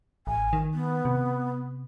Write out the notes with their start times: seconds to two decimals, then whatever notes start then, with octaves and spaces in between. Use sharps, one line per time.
0.27 A1 G#5
0.53 D#3
0.74 B3
1.05 C3